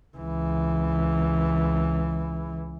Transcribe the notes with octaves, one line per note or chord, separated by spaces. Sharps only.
C#2 E3